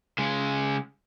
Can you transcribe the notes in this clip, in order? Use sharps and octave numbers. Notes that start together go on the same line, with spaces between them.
C#3 G#3